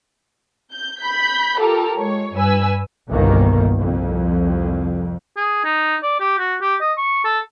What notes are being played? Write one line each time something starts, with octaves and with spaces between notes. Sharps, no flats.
G6
B5 G6 B6
F4 G4 A4 A#4
G#3 C#5
G2 B4 G#5 E6
G1 C2 B2 D#3 A#3
C2 F2
G#4
D#4
D5
G4
F#4
G4
D#5
C#6
A4